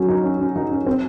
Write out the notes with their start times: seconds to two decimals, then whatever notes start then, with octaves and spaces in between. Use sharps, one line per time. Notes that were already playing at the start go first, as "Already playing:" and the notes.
Already playing: F#3 C#4
0.08 D#4
0.24 C#4
0.41 C#4
0.56 D#4
0.71 C#4
0.86 C4